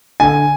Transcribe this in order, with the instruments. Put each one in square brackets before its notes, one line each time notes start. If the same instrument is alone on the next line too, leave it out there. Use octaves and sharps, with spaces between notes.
[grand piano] D3 G#5